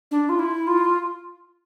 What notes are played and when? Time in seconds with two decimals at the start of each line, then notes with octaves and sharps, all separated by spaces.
0.11 D4
0.29 F4
0.39 E4
0.67 F4